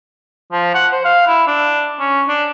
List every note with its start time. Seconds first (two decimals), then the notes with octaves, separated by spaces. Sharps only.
0.52 F3
0.74 F#5
0.92 C5
1.05 F5
1.27 E4
1.47 D4
2.00 C#4
2.28 D4